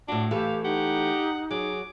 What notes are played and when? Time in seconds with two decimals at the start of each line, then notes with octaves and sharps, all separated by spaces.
0.08 A2 D4 F#4
0.31 E3 A3 G4 A4 F5
0.64 D#4 G4 F#5
1.51 F#3 G#4 D6